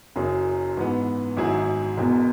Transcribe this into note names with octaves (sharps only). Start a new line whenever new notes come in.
F#1 F#2 F#3 C#4 G#4
G#2 E3 B3
G#1 G#2 F#3 E4 G#4
E1 E2 B2